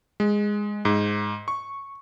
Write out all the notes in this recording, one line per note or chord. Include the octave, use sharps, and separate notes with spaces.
G#3
G#2
C#6